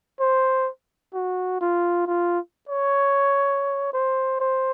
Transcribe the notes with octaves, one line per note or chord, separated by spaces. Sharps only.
C5
F#4
F4
F4
C#5
C5
C5